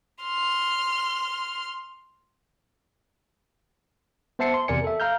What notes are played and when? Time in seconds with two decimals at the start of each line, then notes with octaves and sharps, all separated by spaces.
0.23 C6 F6
4.39 B3 C5 E5 A5 C7 C#7
4.54 C6
4.68 E2 C3 A#4 D5 G#5 C#7
4.84 A4 E5
5.00 F5 A#5 F6 G6